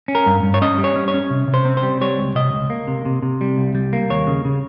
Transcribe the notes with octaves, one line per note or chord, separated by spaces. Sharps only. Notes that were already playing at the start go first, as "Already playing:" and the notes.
C#4
A#4
G2
G2
C#5
C#4 D#5
G3
C#5
C#4
C#5
C#4
C3
C3
C5
C4
C5
G3
G3 C#5
C#2
C3 D#5
C#2
A#3
C3
C3
C3
G3
C2
G3
A#3
D#2 C#5
C#3
C#3